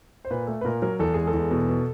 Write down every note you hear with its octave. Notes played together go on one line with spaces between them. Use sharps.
C5
A#2 B4
A3 A4
B4
A#2 A#4
F#3 A#4
E2 A4
G#3 G#4
A4
E2
B2
B2